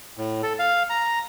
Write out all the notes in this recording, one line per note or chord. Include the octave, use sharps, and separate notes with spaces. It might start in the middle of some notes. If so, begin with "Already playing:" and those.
A2
A4
F5
A#5